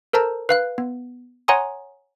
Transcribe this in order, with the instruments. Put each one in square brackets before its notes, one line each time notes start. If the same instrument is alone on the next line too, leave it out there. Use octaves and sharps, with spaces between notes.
[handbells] A4 A#4 C5 A5 A#5
B4 F5 F#6
B3
C#5 F#5 G#5 A#5 C6 D#6